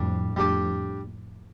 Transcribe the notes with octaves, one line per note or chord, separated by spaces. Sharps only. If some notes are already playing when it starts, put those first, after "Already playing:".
Already playing: F2 A2 G3 D4
F2 A2 G3 D4 G4